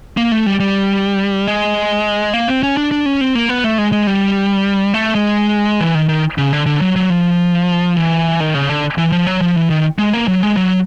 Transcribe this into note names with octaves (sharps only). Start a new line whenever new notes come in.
A#3
A3
G3
G3
G#3
A#3
C4
C#4
D4
D4
C#4
C4
A#3
B3
A3
G#3
G#3
G3
A3
G#3
E3
D#3
D#3
C#3
D3
D3
F#3
F#3
F3
E3
D#3
C#3
D3
E3
F3
F#3
F3
E3
D#3
G#3
A#3
F#3
G#3
F#3